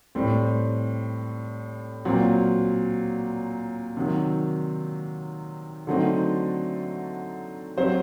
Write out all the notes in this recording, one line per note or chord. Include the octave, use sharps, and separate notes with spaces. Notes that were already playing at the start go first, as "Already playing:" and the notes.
A2 G3 C4
A#2 F#3 C4
C3 D#3 F#3
D3 F#3 A3 C4 D#4
F#3 C4 G4 C5